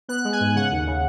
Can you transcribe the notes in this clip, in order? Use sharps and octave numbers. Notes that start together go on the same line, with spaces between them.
B3 F#6
G#3
G#5
G#2
C#3 F#5
D#2
C#3